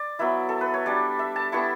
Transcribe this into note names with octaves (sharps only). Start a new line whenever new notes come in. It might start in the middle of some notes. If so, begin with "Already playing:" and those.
Already playing: D5
F#3 B3 E4 E5
A4
B4
C#5
G3 D4 D5
E5
A5
G3 B3 E4 C#6